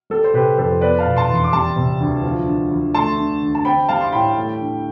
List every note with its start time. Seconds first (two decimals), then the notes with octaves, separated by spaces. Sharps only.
0.10 G3 A4
0.24 C5
0.34 C3 G4 B4
0.58 F2 A4 C5
0.81 B3 B4 D5
0.99 F5 A5
1.05 B2
1.17 A5 C6
1.28 E2
1.35 C6
1.44 D6
1.53 G3 A5 C6
1.76 C3
2.00 D2
2.23 F3
2.47 D3
2.71 D2
2.94 A3 A5 C6
3.18 D3
3.42 D2
3.55 A5
3.65 C4 G5 B5
3.89 G3 F5 A5
4.01 C6
4.12 A2 G5 B5
4.37 A3
4.60 D3